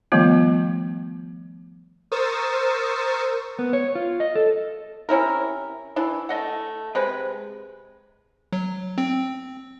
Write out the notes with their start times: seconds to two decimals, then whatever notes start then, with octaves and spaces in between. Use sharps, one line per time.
0.12 D#3 F3 G3 A3 B3 F4
2.12 A#4 C5 C#6 D#6 E6 A6
3.59 B3
3.73 C#5
3.95 F4
4.20 D#5
4.35 A4
5.09 C3 C#4 E4 A#4
5.96 E3 D4 E4
6.29 A3 D#5 F#5
6.95 C3 G#3 B4
8.53 F#3
8.98 C4